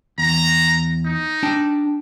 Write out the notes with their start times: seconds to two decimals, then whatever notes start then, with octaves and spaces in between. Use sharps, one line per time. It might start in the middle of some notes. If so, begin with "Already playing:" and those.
0.18 E2 A#5
1.05 D#4
1.43 D4 G5 A5